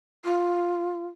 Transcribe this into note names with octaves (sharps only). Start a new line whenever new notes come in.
F4